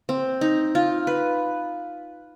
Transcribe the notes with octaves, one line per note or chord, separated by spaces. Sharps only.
C4
D#4
F4
B4